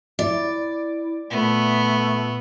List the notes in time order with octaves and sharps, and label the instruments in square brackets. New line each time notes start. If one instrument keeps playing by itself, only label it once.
[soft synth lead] E4 [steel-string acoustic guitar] D5
[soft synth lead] A#2 [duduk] A3 [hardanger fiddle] B3